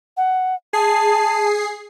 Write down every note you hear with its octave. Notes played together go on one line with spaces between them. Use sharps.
F#5
G#4 A5 C7